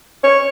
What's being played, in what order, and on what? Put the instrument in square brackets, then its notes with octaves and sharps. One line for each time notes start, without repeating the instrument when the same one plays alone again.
[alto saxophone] C#5